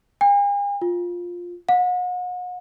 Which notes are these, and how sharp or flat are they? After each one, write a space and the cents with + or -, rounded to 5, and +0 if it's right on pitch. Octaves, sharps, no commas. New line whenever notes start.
G#5 -45
F4 +10
F#5 -40